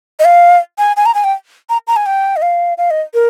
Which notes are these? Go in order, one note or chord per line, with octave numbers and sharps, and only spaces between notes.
D#5
F5
G#5
G#5
A#5
G#5
G5
A#5
A#5
G#5
G5
D#5
F5
F5
D#5
A#4